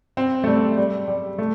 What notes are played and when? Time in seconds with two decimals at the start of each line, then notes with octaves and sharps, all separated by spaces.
0.17 C4
0.44 A3
0.47 G3
0.77 G3
1.08 G3
1.38 A3